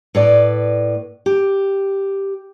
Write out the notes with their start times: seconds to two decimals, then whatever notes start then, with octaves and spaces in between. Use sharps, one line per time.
0.15 A2 B4 D5
1.26 G4